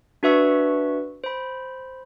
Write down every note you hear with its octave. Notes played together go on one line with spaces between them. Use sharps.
D4 F#4 B4 E5 C#6 E6
C5 B5